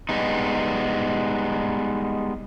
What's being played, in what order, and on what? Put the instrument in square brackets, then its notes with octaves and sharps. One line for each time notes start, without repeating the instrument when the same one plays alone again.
[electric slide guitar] G3 G#3 B3 D#4